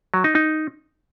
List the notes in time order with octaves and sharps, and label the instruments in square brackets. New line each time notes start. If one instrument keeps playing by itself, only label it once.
[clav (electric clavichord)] F#3
D#4
D#4